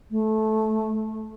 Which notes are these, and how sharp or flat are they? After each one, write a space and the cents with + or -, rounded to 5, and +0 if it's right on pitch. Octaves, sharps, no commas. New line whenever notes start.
A3 -15